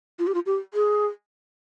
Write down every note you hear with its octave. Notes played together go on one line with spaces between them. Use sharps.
F4
G4
F4
G4
G#4